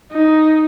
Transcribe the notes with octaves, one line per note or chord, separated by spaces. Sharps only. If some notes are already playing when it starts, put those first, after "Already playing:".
D#4